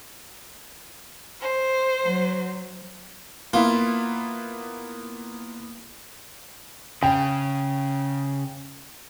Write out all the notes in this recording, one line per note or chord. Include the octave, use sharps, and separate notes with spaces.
C5
F#3
A#3 B3 E4 F4
C#3 G5